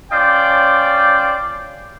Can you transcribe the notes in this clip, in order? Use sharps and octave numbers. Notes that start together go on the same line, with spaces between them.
C#4 F4 C5 D5 G5